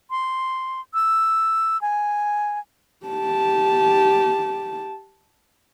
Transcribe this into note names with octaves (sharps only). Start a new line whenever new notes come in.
C6
E6
G#5
G4 A5